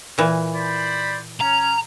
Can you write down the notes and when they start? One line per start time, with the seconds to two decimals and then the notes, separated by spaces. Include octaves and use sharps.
0.18 A#2 E3
0.56 C5 D5 B5
1.41 C#4 A#5